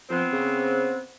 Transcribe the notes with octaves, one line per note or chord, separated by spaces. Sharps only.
F3 B3 C4
C#3